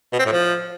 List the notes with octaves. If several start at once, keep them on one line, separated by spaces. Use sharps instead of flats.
B2
C4
A2
F3